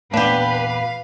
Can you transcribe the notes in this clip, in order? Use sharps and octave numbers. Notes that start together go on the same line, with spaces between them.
E2 A#2 B3 D4 G4 B4 F5